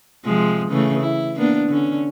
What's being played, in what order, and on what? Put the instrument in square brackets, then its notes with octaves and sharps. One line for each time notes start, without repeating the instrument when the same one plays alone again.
[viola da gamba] C3 F3 G#3
C#3 E3 A3
E4
A#3 B3 D4
D3 C#4